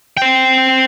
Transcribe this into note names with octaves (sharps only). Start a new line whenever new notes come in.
C5 G5